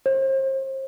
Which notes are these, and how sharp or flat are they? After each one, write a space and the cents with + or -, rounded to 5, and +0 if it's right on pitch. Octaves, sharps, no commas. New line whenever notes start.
C5 +35